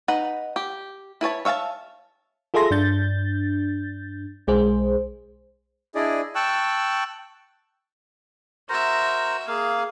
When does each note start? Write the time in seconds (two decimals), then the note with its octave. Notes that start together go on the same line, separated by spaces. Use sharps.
0.08 D#4 B4 F#5
0.56 G4
1.21 E4 B4 C#5 A5
1.45 C#5 E5 F5 G#5 A5
2.54 F4 G#4 A4 E5 C6 A#6
2.70 G2 D4 G6 A6
4.47 B1 G#3 G#4 C5
5.95 D4 E4 G#4 D5 D#5
6.35 G5 A5 C#6 E6 F#6
8.69 F#4 A#4 C5 E5 A#5
9.47 A#3 G#4 F5